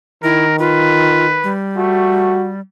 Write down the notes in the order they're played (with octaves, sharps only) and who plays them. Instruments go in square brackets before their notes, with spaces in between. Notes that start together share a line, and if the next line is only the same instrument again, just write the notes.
[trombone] D#3 [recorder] E4 [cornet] A#4
[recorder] F4 [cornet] B4
[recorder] G3
[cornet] A3 [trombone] F#4